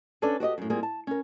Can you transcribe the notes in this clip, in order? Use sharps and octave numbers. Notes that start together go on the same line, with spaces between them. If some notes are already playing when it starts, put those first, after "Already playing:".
C#4 D4 A4 B4 D5
F#4 G4 D5 D#5
F#2 A2
G3 A#3 C4 F4 G#4
A5
C#4 A#4